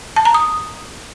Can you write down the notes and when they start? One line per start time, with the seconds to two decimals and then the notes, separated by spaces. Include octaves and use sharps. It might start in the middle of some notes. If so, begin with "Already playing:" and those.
0.16 A5
0.25 A#5
0.34 D#6